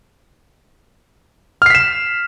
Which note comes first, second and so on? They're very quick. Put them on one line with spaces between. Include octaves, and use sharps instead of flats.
F6 C7 B6 E7